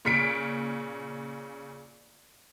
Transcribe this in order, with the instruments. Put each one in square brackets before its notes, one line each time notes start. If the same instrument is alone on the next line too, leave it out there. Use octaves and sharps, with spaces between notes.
[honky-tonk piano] A#2 C#3 F6 B6 C#7 D7